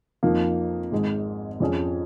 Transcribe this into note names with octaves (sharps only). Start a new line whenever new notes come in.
F2 F3 A#3 D#4
G#1 G#2 G#3
F2 F3 C#4 G#4